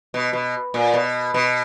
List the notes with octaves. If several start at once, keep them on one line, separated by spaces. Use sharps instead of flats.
B2
B2
A#2
B2
B2